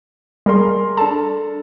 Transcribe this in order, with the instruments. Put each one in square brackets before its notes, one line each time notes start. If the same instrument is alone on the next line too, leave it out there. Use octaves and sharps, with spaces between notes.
[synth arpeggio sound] G3 [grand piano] G#4 A#4 C6
[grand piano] D4 A4 [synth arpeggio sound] A5